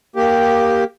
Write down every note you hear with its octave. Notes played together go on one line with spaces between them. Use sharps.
A#3 G4